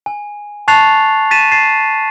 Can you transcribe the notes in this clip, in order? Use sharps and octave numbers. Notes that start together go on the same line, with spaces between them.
G#5
A5 C#6 F#6 A6 C7 F7
A6 B6 D#7 E7
A6 C7 E7